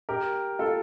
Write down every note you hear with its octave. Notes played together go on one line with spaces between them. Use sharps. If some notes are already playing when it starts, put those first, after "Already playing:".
G4 A#4
F4 A4